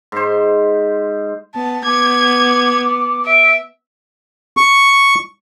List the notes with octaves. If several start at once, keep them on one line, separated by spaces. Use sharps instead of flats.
G#2 C5
B3 A5
B3 D6 G#6
E5 D7
C#6